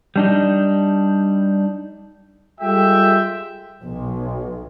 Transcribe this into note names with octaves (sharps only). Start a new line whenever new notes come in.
G3 D4 D#4
G3 G#3 F4 A4 E5 G5
B1